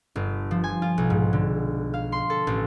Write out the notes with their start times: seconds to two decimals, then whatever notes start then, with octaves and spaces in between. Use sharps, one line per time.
0.16 G1
0.51 F3
0.64 G#5
0.82 F4
0.98 B1
1.10 G#2
1.33 D3
1.94 F5
2.12 C6
2.30 A4
2.47 A1